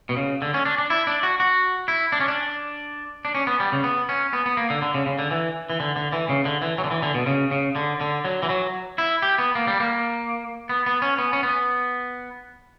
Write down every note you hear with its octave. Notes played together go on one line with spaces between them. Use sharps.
B2
C#3
D3
C#4
D4
D4
E4
D4
F#4
F#4
E4
D4
C#4
D4
D4
C#4
B3
G3
C#3
B3
C#4
B3
B3
A#3
D3
D3
C#3
C#3
D3
E3
E3
D3
D3
E3
C#3
D3
E3
F#3
D3
E3
D3
B2
C#3
C#3
D3
D3
F#3
E3
F#3
E4
G4
B3
A#3
G3
A#3
B3
B3
C#4
B3
C#4
B3